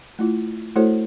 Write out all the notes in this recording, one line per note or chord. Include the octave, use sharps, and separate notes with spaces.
A3 E4 F4
A3 E4 F#4 A4 C5 C#5